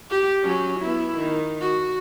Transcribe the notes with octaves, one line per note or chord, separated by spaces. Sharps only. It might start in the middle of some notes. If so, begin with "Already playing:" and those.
G4
F#3 C#4
B3 E4
D#3
F#4